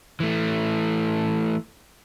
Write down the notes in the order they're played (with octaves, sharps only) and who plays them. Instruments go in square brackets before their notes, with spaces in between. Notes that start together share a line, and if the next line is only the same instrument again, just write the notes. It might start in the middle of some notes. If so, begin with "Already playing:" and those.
[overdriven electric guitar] E3 A3